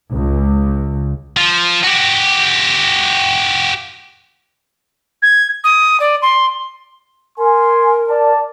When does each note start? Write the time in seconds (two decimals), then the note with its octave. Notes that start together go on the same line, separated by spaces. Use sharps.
0.13 C#2
1.37 F3
1.84 F#4 G4
5.22 G#6
5.64 D#6
6.00 D5
6.22 C6
7.38 A#4 G#5 C6
8.09 D5 A5